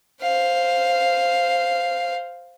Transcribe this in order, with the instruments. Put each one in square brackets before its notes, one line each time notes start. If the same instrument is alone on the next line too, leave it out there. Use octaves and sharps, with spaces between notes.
[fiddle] C5 F5